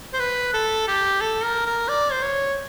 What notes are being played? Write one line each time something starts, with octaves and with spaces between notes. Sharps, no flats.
C5
B4
A4
G4
A4
A#4
A#4
D5
C5
C#5